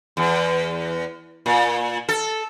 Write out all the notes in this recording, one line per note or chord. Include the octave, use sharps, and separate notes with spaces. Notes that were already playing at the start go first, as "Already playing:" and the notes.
E2
A#2
A4